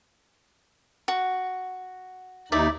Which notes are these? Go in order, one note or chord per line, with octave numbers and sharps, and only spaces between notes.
F#4
D#2 D#4 E4 D5 E5